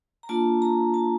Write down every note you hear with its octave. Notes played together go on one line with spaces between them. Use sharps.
A#5
A#3 D4 F4 A5
A#5
A5